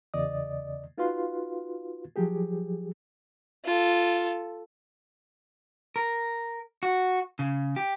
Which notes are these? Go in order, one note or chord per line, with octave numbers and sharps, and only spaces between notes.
E2 C#3 D5 D#5 D#6
D#4 F4 F#4 B4 F5 C6
F3 F#3 G4 G#4
F4 A4
A#4
F#4
C#3
G4